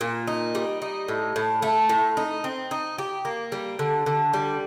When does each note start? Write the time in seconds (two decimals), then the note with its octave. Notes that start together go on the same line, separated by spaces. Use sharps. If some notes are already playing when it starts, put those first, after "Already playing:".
0.01 A#2
0.27 D#4
0.55 G3
0.82 D#4
1.08 A2
1.36 A2
1.62 A3
1.89 A2
2.17 D#4
2.44 C4
2.71 D#4
2.98 G4
3.25 A#3
3.52 G3
3.79 D3
4.06 D3
4.33 G3